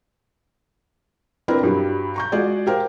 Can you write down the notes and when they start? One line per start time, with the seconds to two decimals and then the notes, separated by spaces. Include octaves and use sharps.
1.48 C4 D4 E4 A#4 B4
1.63 G2 F#3 G3
2.16 A#5 C#6 G6
2.32 G#3 F4 F#4 G#4 D5
2.67 G4 A#4 C5 F5